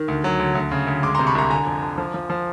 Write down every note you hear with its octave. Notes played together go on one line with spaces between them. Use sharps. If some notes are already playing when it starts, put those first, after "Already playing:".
Already playing: D#3
D2
F#3
D2
D2
C#3
D2
G#3 C6 D6
C3 A#5 C6
B5 C#6
C2 A#5 C6
D3 G#5 A#5
F2
D3
F3
F3
F3